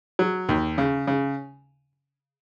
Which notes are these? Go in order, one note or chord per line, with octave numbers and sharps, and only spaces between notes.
F#3
D#2
C#3
C#3